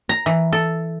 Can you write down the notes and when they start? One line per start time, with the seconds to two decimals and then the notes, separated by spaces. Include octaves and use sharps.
0.09 A#5
0.26 E3
0.53 A4